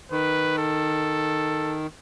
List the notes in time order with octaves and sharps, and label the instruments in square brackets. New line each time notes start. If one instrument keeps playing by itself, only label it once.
[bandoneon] D#3 [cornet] B4
[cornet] A4